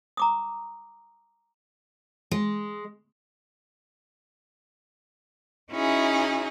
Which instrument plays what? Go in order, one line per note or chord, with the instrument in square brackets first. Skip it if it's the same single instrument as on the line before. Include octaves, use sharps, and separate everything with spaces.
[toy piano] A#5 D6 D#6
[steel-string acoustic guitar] G#3
[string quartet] C#4 D#4 E4 F#4 G#4